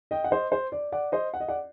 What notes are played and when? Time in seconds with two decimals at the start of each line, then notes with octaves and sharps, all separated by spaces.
0.11 D#5 G5
0.24 F#5
0.31 C5 D#5
0.52 C5
0.72 D5
0.92 D5 F#5
1.12 C5 D#5
1.34 F#5
1.40 D#5
1.48 D5 F#5